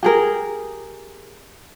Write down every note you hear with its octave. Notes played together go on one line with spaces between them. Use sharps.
G4 G#4 A#4